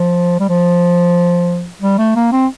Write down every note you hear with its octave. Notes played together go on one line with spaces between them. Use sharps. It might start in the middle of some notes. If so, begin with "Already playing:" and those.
Already playing: F3
G3
F3
G3
A3
A#3
C4